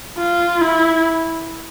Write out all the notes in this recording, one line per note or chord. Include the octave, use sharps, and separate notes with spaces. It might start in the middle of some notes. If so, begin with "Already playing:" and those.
F4
E4